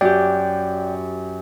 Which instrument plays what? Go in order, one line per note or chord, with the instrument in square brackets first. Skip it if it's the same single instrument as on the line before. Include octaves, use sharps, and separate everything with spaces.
[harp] F#2 G4 [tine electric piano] D5 G5